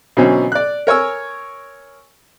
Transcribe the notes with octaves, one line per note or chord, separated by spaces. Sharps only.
B2 D3 E3 F#3 C4 C#4
D5 F#6
A#4 C#5 G#5 E6